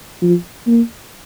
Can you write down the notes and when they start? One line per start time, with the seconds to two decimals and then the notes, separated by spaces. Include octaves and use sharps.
0.21 F3
0.66 A#3